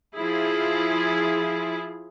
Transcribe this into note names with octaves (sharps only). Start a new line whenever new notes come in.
F3 E4 G#4